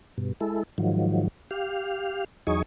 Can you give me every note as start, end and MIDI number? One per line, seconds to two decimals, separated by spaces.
0.18 0.33 43
0.18 0.33 47
0.41 0.63 56
0.41 0.63 64
0.41 0.63 69
0.78 1.28 44
0.78 1.28 51
0.78 1.28 53
0.78 1.28 54
1.51 2.24 67
1.51 2.24 77
2.47 2.62 40
2.47 2.62 54
2.47 2.62 63
2.47 2.62 68
2.47 2.62 75
2.47 2.62 85